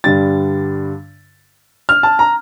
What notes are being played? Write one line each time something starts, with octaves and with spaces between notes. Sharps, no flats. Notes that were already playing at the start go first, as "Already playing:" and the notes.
G2 D3 G3 A6
F6
A5
A#5